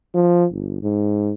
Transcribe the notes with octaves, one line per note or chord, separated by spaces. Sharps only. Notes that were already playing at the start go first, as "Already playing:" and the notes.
F3
G1
G#2